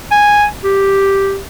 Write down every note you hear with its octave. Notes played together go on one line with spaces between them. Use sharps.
G#5
G4